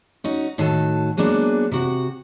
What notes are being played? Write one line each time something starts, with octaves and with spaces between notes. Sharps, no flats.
C#4 D#4 F#4
A2 D#3 F#4 A4
F#3 G#3 A#3 B3 D4
C3 F#4 F#5